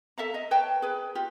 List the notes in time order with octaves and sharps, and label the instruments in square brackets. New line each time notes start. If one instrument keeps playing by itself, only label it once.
[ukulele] A4 E5 F5 A#5
D#5
B4 C#5 G5 A5
G#4 B4
F4 G4